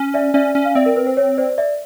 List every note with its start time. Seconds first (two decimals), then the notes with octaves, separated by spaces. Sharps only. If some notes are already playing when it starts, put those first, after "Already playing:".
Already playing: C#4
0.14 D5 E5
0.34 C#4 D5 E5
0.55 C#4
0.65 F5
0.75 C4 D5 E5
0.86 A#4
0.96 B4
1.07 C5
1.17 C#5
1.37 C5 D5
1.58 D5 E5